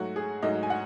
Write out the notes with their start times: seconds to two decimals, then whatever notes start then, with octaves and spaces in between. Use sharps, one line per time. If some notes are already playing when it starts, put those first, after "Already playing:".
Already playing: G#2 F#3 A3 F#4
0.16 G#4
0.42 G#2 F#3 A3 D#5
0.63 G#5
0.70 F#5